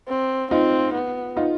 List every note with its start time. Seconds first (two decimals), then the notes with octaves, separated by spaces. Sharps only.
0.09 C4
0.51 C4 D#4 F4
0.94 B3
1.37 D#4 F4